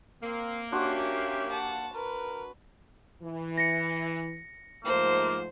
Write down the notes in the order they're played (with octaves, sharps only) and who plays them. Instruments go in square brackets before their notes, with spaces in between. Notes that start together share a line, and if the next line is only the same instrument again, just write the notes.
[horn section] A#3 [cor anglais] C4
[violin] C#4 E5 [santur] D4 F#4 C5 [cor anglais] G4
[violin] F#5 A5
[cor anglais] A#4 [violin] B4
[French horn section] E3
[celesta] A#6 C#7
[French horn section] G#2 F3 A3 [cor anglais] A#3 [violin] C5